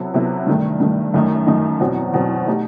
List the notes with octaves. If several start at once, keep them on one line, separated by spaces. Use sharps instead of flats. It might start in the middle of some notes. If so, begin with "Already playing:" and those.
Already playing: C3 F#3 B3 E4 A4
C3 F#3 B3 E4 A4
G2 D#3 A3
G2 D#3 A3
F#2 D#3 A3 D#4
F#2 D#3 A3 D#4
E2 B2 F#3 C4
E2 B2 F#3 C4
A3 D#4 G4